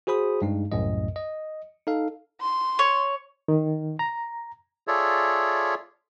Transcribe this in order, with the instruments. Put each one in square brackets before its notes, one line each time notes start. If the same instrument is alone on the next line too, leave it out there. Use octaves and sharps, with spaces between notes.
[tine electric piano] F#4 G#4 C5 B5 D#6
G2 G#3 D#4
C2 F#2 A2 D#5
D#5
D#4 A4 F5
[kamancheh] C6
[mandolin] C#5
[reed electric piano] D#3
A#5
[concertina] F4 G#4 A4 C#5 D5 E5